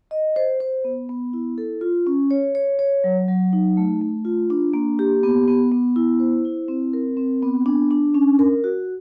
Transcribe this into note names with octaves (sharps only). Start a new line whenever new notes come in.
D#5
C5
C5
B3
B3
E4
A4
F4
C#4
C#5
C#5
C#5
F#3
F#3
D#4
A3
A3
F4
D4
A#3
G4
B3
B3
B3
E4
C5
E4
C4
A#4
C4
B3
D4
D4
C#4
A#4
F#4